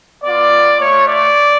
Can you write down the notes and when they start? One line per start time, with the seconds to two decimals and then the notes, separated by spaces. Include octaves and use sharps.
0.24 B3 F4 D5
0.80 A3 F4 C#5
1.08 D5